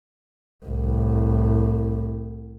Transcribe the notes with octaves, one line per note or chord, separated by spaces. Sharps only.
C2 A2